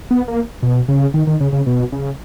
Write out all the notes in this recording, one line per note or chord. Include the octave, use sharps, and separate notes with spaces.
B3
A#3
B2
C#3
D#3
D#3
C#3
C#3
B2
C#3